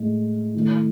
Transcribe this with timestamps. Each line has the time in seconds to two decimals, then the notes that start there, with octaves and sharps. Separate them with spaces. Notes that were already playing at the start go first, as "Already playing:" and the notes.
Already playing: A2 G#3 D#4
0.55 D#3 A3 E4